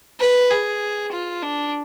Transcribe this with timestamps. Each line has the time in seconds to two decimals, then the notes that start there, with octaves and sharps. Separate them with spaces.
0.20 B4
0.50 G#4
1.12 F4
1.42 D4